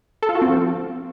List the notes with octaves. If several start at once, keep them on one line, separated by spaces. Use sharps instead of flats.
A4
F4
F#4
C4
F3